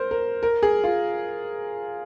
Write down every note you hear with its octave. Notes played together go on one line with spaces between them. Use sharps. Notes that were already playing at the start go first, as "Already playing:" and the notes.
Already playing: A#4 C5
A#4
A#4
G#4
F4